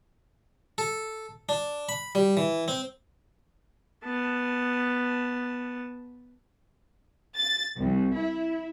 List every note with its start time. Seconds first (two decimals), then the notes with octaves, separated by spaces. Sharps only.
0.78 A4
1.49 D4
1.89 B5
2.15 G3
2.37 E3
2.68 C4
4.04 B3 A5
7.36 A6
7.78 C2
8.16 E4